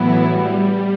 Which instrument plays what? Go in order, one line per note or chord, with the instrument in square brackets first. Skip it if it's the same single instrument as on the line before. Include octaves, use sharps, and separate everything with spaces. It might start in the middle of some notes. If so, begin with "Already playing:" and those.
Already playing: [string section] A2 F#3 B3 E4 [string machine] E3
[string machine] G3